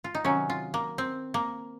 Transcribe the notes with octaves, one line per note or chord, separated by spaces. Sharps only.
F4
D#4
C3 D#3 F#3 C#4
F4
A#3
C4
A#3